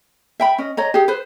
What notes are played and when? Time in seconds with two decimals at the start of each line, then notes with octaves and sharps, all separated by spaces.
0.40 E5 G5 B5
0.58 C#4 D#5
0.77 C#5 D#5 A#5
0.94 G4 G#4
1.08 B4 C5